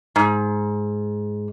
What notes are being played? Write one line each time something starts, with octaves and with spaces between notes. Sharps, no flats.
G#2